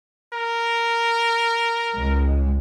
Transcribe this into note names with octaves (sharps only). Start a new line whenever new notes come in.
A#4
C#2 G#3